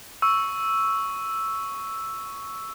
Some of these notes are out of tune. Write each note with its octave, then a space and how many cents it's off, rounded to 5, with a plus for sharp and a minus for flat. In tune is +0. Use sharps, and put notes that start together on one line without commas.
C#6 +5 E6 +0